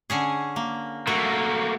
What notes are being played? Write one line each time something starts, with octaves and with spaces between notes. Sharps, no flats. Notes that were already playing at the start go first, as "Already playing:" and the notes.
D3 C#4 G#4
A#3
A3 A#3 F#4